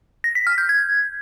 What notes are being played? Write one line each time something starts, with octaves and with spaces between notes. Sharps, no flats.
A#6
B6
F6
G6
G#6